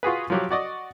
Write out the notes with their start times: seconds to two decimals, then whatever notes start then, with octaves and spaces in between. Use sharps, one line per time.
0.03 F4 F#4 G#4 B4
0.30 F3 F#3 G4
0.50 F#4 D5 D#5